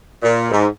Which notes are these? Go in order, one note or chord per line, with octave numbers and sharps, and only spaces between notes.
A#2
G#2